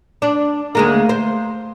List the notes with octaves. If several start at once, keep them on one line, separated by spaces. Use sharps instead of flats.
D4
D2 G#3 A#3
C5